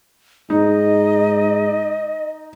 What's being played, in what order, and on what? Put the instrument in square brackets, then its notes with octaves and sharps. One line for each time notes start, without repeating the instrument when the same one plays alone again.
[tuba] G#2 [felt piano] D#4 [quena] D#5